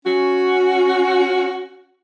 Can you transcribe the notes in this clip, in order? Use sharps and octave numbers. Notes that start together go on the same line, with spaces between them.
C#4 F#4